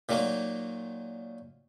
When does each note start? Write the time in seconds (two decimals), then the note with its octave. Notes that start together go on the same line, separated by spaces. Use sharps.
0.09 A#2 D#3 F#3 A#3